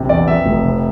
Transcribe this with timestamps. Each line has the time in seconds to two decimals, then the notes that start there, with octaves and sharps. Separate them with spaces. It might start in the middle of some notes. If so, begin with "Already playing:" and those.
Already playing: A#1 C3
0.09 E2 D5
0.28 F2 E5
0.46 F1
0.64 C3